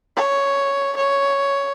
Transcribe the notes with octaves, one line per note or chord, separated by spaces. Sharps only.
C#5
C#5